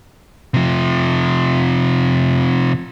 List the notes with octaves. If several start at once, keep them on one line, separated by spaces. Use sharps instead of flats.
C3 F3